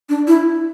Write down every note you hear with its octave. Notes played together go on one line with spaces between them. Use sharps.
D4
E4